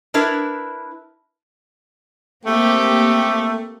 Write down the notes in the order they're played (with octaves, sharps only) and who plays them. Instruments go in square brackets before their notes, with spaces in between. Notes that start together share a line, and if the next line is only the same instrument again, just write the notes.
[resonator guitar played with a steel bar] D4 E4 A#4 B4 E5
[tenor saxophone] A3 [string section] A#3 C4 G4